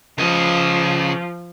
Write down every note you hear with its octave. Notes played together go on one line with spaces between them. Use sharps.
C#3 F3 D#5